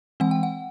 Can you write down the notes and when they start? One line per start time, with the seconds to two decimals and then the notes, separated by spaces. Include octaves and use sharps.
0.20 E3 G#3 C4 F#5
0.31 G5
0.43 F#5